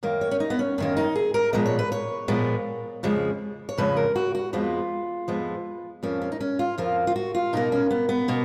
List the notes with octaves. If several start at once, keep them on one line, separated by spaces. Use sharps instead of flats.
F#2 D#3 A#3
C#5
C#4
D#4
B3
C#4
F#2 D#3 A#3 C#4
D#4
G#4
A#4
A#2 F3 G#3 B3 D#5
C#5
B4
C#5
A#2 F3 G#3 B3
F2 C#3 F3 G#3
C#5
F2 C#3 F3 G#3 B4
A#4
F#4
F#4
F2 F3 G#3 B3 F4
F2 F3 G#3 B3
F2 F3 A#3 C#4
C#4
D#4
C#4
F4
F2 F3 A#3 F4
F4
F#4
F4
B2 A#3 D#4
C#4
B3
B3
B2 A#3